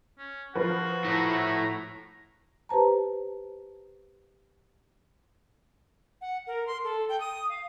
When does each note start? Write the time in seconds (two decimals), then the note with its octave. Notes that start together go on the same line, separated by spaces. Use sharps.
0.18 C#4
0.55 F3 F4 F#4 B4
1.04 A3 E4 E5 A#5
2.69 G4 B4 C5 A5 A#5
6.21 F#5
6.47 A#4
6.67 C6
6.84 A4
7.09 G5
7.20 D#6
7.49 F5